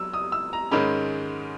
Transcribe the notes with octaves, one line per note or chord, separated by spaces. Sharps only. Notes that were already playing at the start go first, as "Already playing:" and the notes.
Already playing: F#3 E6
D#6
E6
A#5
G#2 D#3 G#3 C#4 B5